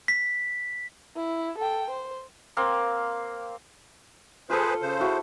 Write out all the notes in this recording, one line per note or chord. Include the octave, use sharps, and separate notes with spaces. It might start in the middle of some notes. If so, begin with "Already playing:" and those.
B6
E4
A4 G5
C5
A#3 C4 F5
F4 G#4 A4 B4 C5
C#3 C5
E4 F#4